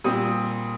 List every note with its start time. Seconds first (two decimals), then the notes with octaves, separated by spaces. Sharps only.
0.04 A#2 G3 C4 D#6